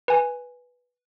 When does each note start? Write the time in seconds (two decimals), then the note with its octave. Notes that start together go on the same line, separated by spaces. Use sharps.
0.08 B4 G#5